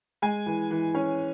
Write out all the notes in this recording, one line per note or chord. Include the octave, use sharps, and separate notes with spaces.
G#3 G#5
E3
E3
C#4